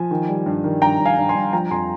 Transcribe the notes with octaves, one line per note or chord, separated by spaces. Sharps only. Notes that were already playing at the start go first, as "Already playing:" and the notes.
Already playing: F3 G#5
D#3
G3
G2
D#3
G2 G5 A#5
G2
F5 G#5
G2
G#5 C6
G2
F3 G5 A#5
F2 G#5 C6